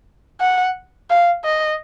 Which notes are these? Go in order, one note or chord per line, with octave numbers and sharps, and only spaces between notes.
F#5
F5
D#5